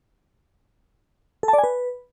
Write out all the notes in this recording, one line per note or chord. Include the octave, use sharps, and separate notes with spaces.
A4
A5
D5
G#5
B4